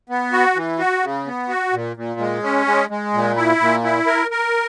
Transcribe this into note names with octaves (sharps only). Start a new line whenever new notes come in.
B3
F#4
E3
F#4
C#3
B3
F#4
A#2
A#2
G#3
C#4
G#3
G#3
A#2
E4
A#2
E4
A#4
A#4